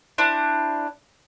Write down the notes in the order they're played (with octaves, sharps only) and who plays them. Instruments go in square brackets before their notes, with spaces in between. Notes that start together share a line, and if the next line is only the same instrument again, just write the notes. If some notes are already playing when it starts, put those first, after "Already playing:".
[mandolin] D4 E4 C5